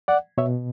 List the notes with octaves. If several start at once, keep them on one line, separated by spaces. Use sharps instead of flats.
D5 F#5
B2 C#5 E5